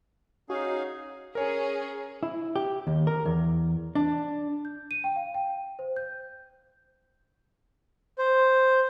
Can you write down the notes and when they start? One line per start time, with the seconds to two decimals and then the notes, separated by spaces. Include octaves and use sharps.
0.50 C#4 D#4 F#4 G#4 F5
1.35 C#4 G#4 A#4 C#5
2.23 E4
2.56 G4
2.87 D#2
3.07 A#4
3.25 E2
3.95 D4
4.65 G6
4.91 D#7
5.04 G5
5.16 F5
5.34 G5
5.79 C5
5.96 G6
8.18 C5